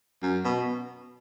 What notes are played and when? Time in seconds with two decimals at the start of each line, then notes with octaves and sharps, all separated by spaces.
0.22 F#2
0.44 B2